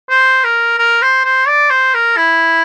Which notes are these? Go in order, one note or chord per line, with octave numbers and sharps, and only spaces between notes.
C5
A#4
A#4
C5
C5
D5
C5
A#4
E4